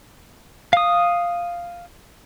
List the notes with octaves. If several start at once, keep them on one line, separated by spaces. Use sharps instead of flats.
F5 D#6